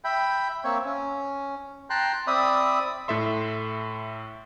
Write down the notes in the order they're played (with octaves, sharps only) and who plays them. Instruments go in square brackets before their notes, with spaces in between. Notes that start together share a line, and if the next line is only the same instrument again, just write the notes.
[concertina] E5 G5 B5
A#3 C4 C#5 E5
C#4
G5 A5 A#5 C6 F#6
C4 D5 E5 B5 D#6
[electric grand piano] A2 A4 E5 C6